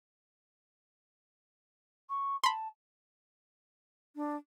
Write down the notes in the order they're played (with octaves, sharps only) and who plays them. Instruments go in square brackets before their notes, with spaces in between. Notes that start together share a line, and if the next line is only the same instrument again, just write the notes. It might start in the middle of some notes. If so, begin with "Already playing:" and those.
[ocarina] C#6
[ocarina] A5 [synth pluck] B5 C6
[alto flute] D4